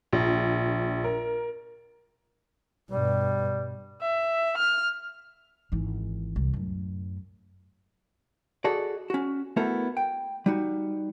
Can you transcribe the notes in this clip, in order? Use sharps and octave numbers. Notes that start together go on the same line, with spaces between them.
A#1
A#4
G2 B2 G3
E5
F6
G#1 E3
C2
F#2 A2
F#4 G#4 A4 D5 D#5
C#4 F#4
A3 B3 E4 F#4 A4 A#4
G5
G3 D#4 F#4